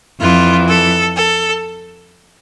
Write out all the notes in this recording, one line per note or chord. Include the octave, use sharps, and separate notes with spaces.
F2 E3 F4
A4
A4